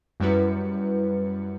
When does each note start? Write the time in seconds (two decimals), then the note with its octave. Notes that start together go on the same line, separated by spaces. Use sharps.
0.20 F#2 G3 E4 B4 C#7